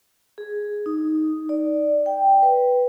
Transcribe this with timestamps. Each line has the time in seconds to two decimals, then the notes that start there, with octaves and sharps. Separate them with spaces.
0.38 G#4
0.86 D#4
1.49 D5
2.06 G5
2.42 B4